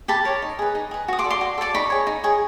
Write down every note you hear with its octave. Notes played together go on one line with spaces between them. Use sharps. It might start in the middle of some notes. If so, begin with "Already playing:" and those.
G4 A5 B5
A#4 C#5
D#4
G#4 B4
D#4
G#4 B4
F#4 D#6
C6 D6
A4 D5
C6 D6
F#4
A4 D5 D6
D#4 B5 C#6
G#4 C#5
D#4
G#4 C#5